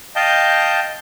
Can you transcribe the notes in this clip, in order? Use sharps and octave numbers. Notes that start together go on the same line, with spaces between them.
D#5 F5 G5 A5 G6